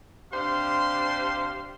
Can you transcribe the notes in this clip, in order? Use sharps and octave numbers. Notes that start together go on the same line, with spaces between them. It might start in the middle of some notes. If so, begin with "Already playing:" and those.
C3 D4 G4 C5 F5 C6